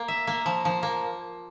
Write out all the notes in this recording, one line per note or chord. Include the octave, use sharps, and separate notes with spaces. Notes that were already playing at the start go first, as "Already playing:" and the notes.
Already playing: A#3
E5
A#3
F3
F3
A#3